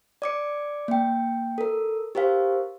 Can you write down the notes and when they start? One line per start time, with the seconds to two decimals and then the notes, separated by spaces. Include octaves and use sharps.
0.22 D5 D6 C#7
0.88 A#3 G5
1.58 A4 A#4
2.15 G4 A#4 C5 F5